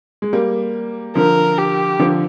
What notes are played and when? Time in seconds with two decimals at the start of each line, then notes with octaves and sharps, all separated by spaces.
0.22 G#3
0.33 G3 A#3
1.15 D3 F3 A#4
1.58 G4
1.99 D3 F3